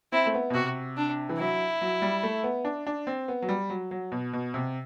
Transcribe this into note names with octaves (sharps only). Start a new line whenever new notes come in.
C4 E4
A3
B3
B2
C3 F#4
D4
E3
F#3 E4
F#3
G3
A3
B3
D4
D4
C4
B3
F#3
G3
F#3
F#3
B2
B2
C3